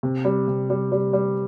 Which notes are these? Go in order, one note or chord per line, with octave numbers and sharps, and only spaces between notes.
C3
G3
C3
G3
G3
G3